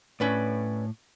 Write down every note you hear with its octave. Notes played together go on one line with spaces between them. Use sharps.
A2 C#4 B4 D5